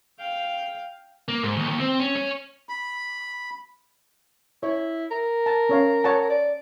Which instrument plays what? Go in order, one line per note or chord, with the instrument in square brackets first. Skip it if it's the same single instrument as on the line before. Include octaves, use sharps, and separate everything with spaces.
[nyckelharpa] F5 G5
[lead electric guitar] A#3
G#2
D#2
D#2
C4
C#4
C#4
[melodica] B5
[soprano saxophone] E4 [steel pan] C#5
[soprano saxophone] A#4
[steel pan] A5
C#4 C#5 F5
C#5 F#5 A5
[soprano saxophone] D5